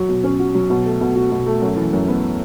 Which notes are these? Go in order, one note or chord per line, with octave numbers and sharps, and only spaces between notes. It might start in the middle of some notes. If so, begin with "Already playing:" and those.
Already playing: F#3 F#4
B2
C#4
F#4
F#3
B2
A3
B2
F#4
B2
A3
F#2
E3
F#2
B3